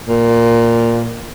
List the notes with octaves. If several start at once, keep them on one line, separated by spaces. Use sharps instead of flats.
A#2